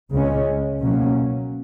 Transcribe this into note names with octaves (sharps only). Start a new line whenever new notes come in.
C#2 C#3 G#3 C#4
B2 F#3 A#3 C#4